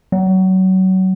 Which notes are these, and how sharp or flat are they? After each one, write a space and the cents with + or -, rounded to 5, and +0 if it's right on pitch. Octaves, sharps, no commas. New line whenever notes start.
F#3 +25